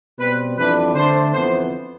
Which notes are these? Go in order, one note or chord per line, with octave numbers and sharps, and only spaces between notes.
B2 G3 C4 B4
F2 E3 G3 D4 B4
D3 A3 D4 C5
F2 E3 B3 C5